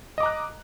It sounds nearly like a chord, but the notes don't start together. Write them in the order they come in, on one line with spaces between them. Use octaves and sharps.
D#5 D6 A#5 F#6